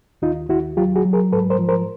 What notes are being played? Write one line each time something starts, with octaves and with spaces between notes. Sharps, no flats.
D#2 D#4 F4
D#2 E4 F#4
F#3 F4 G4
F#4 G#4
F#3
G#4 A#4
G#2 A4 B4
A#4 C5
F3
A#4 C5